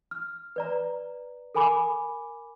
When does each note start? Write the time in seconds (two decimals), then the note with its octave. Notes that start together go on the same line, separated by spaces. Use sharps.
0.11 F6
0.56 B4 D5 A#5
1.55 A4 A#4 G#5 B5 D6